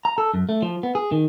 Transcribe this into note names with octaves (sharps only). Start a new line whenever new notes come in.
A#5
A4
F#2
A3
F3
B3
G#4
D#3